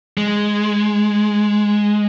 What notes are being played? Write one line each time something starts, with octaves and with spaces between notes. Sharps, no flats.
G#3